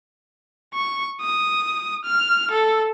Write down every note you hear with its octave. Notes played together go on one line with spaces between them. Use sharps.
C#6
D#6
F6
A4